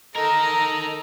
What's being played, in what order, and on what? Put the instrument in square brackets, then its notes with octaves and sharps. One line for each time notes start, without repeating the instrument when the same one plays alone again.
[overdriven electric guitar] D#4 A#4 [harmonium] A4 D#5 [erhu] A#5